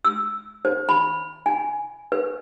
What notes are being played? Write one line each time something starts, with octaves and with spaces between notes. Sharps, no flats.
E6
C5
B5
G#5
B4